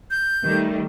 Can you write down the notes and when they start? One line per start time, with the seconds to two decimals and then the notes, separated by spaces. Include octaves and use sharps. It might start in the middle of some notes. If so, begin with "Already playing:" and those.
0.11 G6
0.43 D#3 G3 A3